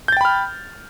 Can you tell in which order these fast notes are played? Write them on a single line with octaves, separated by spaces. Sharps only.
G6 A6 G5 B5 F6